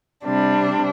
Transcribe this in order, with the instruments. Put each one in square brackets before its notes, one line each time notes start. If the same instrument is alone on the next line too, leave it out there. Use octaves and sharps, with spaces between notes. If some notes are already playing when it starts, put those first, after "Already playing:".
[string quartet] C3 G3 C4 D4